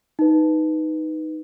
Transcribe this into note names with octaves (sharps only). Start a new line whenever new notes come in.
D#4 B4